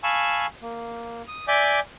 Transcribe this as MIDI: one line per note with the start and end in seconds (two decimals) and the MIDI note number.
0.03 0.46 77
0.03 0.46 80
0.03 0.46 81
0.03 0.46 83
0.03 0.46 85
0.03 0.46 88
0.62 1.22 58
1.28 1.45 87
1.48 1.80 74
1.48 1.80 76
1.48 1.80 80
1.48 1.80 86
1.48 1.80 91